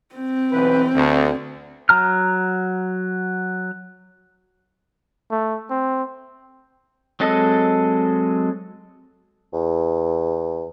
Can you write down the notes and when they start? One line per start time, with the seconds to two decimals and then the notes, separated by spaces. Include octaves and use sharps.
0.15 C4
0.52 B1 E3 B4
0.94 D2
1.89 F#3 A#5 F6
5.31 A3
5.70 C4
7.20 F#3 G#3 C4 A4 D#5
9.53 E2